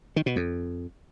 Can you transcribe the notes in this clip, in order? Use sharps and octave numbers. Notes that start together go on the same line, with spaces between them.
D#3
B2
F2